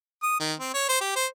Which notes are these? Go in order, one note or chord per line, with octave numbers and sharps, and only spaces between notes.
D#6
D#3
C4
C#5
C5
G4
C5